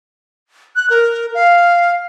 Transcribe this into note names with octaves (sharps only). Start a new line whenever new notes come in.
F#6
A#4
F5